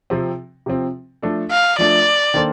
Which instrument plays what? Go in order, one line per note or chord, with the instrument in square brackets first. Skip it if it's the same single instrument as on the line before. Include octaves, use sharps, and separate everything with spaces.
[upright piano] C3 F3 C4
C3 F3 C4
F3 A3 D4 A4
[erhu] F5
[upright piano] F3 A3 D4 A4 [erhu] D5
[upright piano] D#3 A#3 D4 A4 C5